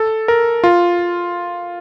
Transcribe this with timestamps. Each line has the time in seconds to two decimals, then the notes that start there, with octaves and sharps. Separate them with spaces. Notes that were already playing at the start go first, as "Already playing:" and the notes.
Already playing: A4
0.28 A#4
0.64 F4